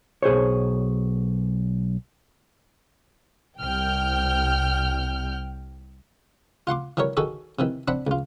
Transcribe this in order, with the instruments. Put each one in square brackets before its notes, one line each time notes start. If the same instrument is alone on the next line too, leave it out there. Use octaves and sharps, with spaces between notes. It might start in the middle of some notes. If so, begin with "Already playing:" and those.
[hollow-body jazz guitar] B1 G#4 C5 C#5
[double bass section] C2 [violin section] G5 F6 G6
[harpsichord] F4 F#5 C6 D6
E3 F#3 G3 A#4 C#5
D#3 F#4 G#4 A4
C3 D#3 E3
C4 D4 F#5 B5
C#2 F4